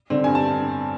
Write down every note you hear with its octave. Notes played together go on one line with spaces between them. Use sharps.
D3 G3 C4
G2 G#5
A5